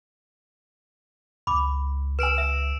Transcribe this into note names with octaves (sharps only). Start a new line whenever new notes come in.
C#2 B5 D6
B4 G#5 E6 D7 E7
E5